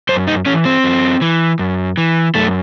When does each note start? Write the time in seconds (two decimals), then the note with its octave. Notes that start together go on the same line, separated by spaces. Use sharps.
0.09 F#2 C5
0.27 D#4
0.46 E3 C#4
0.65 C4
0.84 F#2
1.21 E3
1.59 F#2
1.98 E3
2.35 F#2 A3